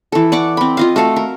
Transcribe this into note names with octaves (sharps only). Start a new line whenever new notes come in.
E3 A4
D5 F#5 C#6 D6
C4 B5
F4 D#5 F5
A3 F#4 A4 F5
A#4